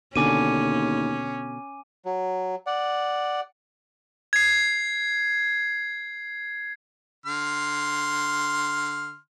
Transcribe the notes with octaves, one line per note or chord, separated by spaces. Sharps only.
D#2 B2 D3 C#4 G#5 D6 D#7
F#3
D5 F#5
G#6 C7
D3 C6 F6